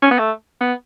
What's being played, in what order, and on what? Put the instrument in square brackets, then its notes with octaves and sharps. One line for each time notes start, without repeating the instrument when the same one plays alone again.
[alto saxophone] C#4
B3
A3
B3